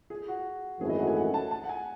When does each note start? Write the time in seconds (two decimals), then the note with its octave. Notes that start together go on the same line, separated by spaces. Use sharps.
0.10 G#4
0.28 F#4
0.80 G#1 F#2 E3 A3 G#4
0.90 D#5
0.99 F#5
1.07 G#5
1.17 F#5
1.34 A5
1.51 A5
1.64 F#5
1.69 G#5